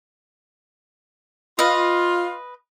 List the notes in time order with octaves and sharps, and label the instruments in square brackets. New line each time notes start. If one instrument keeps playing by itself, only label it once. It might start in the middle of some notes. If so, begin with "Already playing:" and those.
[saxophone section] F4 [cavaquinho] B4 D#5